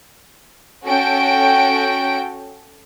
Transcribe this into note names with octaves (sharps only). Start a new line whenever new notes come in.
C#4 F#4 A4 G5 D7